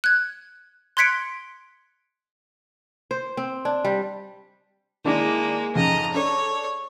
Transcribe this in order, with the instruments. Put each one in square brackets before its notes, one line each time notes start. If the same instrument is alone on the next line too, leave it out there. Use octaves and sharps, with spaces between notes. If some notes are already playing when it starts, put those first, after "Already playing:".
[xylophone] F#6 G#6
C6 F#6 G#6 B6 C#7 D7
[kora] C5
C4
D4
G3
[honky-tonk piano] D#3 D4 E4 [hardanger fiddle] G#3 A#3
[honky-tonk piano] F2 G#2 C#3 [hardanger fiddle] D#5 A#5
[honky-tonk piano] D4 A4 [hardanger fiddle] C#5